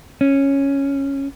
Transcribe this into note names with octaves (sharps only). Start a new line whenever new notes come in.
C#4